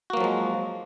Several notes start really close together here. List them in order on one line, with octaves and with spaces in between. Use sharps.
F#4 A#3 F#3 F3 G#3